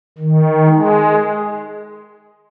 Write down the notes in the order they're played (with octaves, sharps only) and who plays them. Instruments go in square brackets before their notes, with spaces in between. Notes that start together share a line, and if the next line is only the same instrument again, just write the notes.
[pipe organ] D#3
G#3